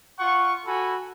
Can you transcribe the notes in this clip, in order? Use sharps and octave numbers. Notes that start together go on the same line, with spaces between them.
F4 F#5 C#6
F#4 A4 G#5 B5